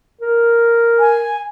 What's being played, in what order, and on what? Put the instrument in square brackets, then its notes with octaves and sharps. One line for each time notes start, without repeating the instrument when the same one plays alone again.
[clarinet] A#4
[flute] G#5